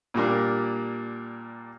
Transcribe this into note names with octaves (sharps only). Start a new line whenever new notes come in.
A#2 G3 A#3 D4